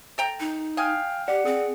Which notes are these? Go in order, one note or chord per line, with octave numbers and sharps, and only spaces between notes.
A4 G5 A#5
D#4
D#5 F5 G5 G#5 F6
G4 D5 F#5
C4 G#4